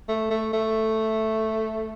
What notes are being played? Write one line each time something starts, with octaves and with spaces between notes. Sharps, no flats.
A3
A3
A3